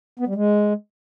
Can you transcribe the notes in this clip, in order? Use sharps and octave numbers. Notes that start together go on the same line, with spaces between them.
B3
G3
G#3